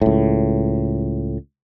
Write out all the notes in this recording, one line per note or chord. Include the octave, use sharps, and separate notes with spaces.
C#2 A2